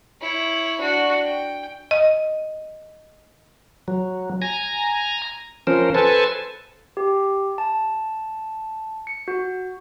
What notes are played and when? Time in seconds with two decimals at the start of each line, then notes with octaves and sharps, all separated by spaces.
0.21 E4 C#5
0.80 D4 F#4
1.24 G5
1.91 D#5
3.88 F#3
4.42 G#5 A#5
5.67 F3 C#4 A#4 C5
5.95 A4 B4 C5 G#5 A5
6.97 G4
7.58 A5
9.07 C#7
9.28 F#4